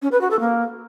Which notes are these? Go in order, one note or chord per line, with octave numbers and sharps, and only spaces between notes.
C#4
B4
F#4
A4
A#3